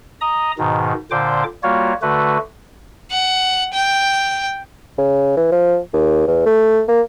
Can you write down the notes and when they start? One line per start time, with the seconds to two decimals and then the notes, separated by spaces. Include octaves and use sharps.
0.21 D#5 A#5 D#6
0.58 G#2 B2 D#3
1.11 A#2 D3 C5 G5 D6
1.63 G3 A#3 F4 F#4 C#5
2.02 D3 A3 F#4 B4
3.12 F#5
3.74 G5
4.98 C#3
5.37 E3
5.52 F3
5.94 D#2
6.28 E2
6.46 A3
6.88 A#3